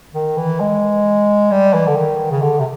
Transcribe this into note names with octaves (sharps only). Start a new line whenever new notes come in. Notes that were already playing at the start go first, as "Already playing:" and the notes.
D#3
E3
G#3
G3
E3
D3
D#3
C#3
D3
C3